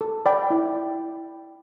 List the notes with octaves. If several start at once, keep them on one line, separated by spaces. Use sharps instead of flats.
A4
D5 G5 B5
E4